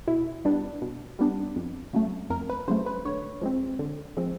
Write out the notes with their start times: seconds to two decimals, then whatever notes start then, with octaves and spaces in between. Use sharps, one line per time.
0.07 B2 E4
0.45 G3 B3 D4
0.82 B2
1.19 G3 B3 D4
1.56 F2
1.93 C#3 F#3 A3
2.30 F2 A#4
2.49 B4
2.68 C#3 F#3 A3 C5
2.86 B4
3.05 D3 C#5
3.41 F3 G#3 C4
3.79 D3
4.17 F3 G#3 C4